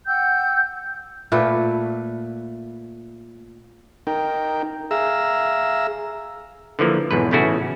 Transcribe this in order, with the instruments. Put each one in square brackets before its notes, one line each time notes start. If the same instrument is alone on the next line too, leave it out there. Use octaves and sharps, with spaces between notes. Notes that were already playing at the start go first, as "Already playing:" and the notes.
[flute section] F#5 G5 E6 G6
[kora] A#2 A3 B4 G5
[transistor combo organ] D#4 A#4 G5
G#4 E5 F5 A#5 E6
[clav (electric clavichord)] D3 E3 F3 A#3
B1 E2 G#2 B4
A1 C#3 A3 C#4 E4 F#4